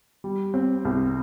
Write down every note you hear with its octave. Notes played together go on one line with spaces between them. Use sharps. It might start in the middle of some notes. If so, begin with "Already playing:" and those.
G3
C4
C2